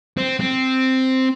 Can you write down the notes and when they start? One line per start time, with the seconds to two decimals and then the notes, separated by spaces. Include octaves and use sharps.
0.17 C4
0.40 C4